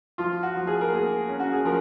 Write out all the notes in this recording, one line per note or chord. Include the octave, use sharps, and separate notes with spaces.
F3 F4
F#4
F3
G#4
A#4
A#3 G#4
C#4
F#4
G#4
F3 A#4